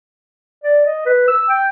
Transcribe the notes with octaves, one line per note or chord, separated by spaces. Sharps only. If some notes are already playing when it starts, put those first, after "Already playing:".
D5
D#5
B4
E6
G5